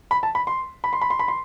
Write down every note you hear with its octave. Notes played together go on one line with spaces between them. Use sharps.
B5
A5
B5
C6
B5
C6
B5
C6
B5
C6